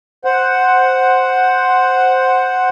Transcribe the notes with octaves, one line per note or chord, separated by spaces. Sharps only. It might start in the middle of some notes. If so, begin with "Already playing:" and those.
C5 F#5